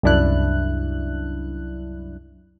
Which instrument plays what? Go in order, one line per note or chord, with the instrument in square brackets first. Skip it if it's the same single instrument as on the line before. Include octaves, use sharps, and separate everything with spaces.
[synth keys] C2 F#2 D4 E4 F#6